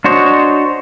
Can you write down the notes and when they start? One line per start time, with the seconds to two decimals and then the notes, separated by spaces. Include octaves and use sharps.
0.04 D4 F#4 C5 C#5 D#5